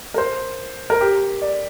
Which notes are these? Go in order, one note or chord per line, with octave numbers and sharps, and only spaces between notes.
A#4
C5
A#4
G4
D5